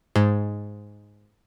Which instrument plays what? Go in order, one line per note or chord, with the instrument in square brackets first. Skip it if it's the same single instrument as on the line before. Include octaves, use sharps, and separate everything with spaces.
[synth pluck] G#2